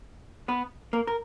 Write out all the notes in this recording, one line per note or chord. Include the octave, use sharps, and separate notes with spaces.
B3 B4
A#3 A#4
A#4